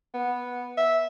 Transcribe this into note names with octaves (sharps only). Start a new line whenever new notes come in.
B3
E5